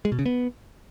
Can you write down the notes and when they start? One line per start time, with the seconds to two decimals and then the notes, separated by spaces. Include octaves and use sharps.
0.05 G#3
0.12 B2
0.19 C#3
0.26 B3